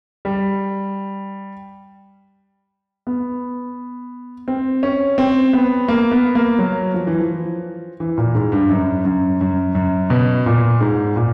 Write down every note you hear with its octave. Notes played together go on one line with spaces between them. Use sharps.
G3
B3
C4
C#4
C4
B3
A#3
B3
A#3
F#3
F3
E3
F3
E3
A#2
G#2
G2
F#2
F#2
F#2
F#2
B2
A#2
G#2
A#2